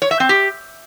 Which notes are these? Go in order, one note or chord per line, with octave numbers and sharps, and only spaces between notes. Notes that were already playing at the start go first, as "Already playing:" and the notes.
C#5
E5
C4
G4